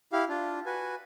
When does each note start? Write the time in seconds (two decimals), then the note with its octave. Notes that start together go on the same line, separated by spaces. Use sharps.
0.13 E4 G4 F5
0.29 D4 F4
0.66 F#4 B4 G#5